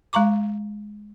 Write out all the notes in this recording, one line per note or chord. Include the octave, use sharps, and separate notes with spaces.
G#3 F5 A#5 C#6 D6